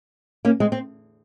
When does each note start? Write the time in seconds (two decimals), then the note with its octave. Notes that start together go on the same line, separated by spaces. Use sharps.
0.45 A#3 C#4
0.60 G#3 C4
0.72 C4